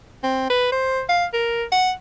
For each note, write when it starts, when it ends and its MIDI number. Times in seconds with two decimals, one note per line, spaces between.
0.23 0.50 60
0.50 0.71 71
0.72 1.02 72
1.09 1.25 77
1.33 1.64 70
1.72 1.92 78